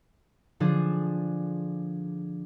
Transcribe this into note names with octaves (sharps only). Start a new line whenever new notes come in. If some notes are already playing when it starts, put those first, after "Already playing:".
D3 F3 D4 G#4